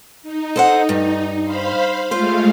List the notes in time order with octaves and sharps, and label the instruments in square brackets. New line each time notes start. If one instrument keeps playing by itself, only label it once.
[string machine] D#4
[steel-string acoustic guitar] A4 C5 F#5
G2
[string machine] C5 F5 B5
[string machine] G#3 A3 F5 [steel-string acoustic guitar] F4 C5